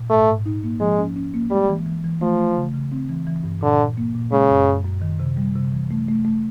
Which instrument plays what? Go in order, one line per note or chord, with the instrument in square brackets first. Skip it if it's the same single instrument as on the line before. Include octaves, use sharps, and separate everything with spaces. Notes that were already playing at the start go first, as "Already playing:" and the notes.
Already playing: [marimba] A#2
[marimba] G#2 [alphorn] A3
[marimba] G#2
D#4
A#3
[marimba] F3 [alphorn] G#3
[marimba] C#4
C#4
A#3
[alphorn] G3 [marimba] G#3
[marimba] E3
E3
E3
[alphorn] F3 [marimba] A3
[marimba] A3
C#3
C#3
C4
E3
E3
G2
[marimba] A#2 [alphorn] D3
[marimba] A#2
A#3
A#2
[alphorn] C#3 [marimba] G#3
[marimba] F#2
F#2
F#2
D#3
C3
G3
C3
E3
A3
A3
A3